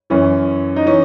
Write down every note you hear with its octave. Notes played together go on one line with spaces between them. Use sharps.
F#2 E3 C#4
D#4
E3 C#4